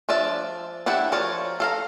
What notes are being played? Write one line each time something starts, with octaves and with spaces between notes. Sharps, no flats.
F3 D4 D5 E5
D4 E4 G4 E5 F#5
F3 A#4 C#5 D5
A4 F5 A#5